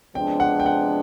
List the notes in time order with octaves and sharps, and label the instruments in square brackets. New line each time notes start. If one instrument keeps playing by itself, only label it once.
[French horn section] C3 F3 G#3 B3 D4 [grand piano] G5
[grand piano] F#5
G5
F#5